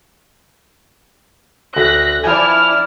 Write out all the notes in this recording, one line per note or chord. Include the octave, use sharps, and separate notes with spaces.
D2 F#6 A#6 B6
F3 E4 D5 G5 G#5 F6